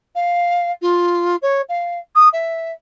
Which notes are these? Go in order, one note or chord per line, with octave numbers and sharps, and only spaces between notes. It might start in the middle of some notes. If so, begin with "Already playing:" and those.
F5
F4
C#5
F5
D#6
E5